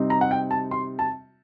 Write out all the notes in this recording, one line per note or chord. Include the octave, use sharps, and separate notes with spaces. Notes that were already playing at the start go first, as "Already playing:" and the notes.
Already playing: C3 G3 C4 D#4
A#5
F#5
G5
A5
C6
A5